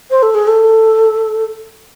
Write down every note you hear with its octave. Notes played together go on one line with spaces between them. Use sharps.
C5
A4
G#4
A4